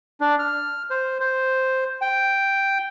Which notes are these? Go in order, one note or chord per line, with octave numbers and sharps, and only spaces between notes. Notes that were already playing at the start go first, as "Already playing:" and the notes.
D4
F6
C5
C5
G5